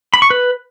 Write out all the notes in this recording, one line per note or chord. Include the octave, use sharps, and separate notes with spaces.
B5
C#6
B4